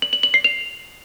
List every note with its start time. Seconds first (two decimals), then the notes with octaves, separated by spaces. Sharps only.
0.02 F#7
0.13 F#7
0.23 F#7
0.34 C7
0.44 F7